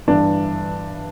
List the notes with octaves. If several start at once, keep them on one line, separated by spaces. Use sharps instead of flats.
G1 G2 E3 D4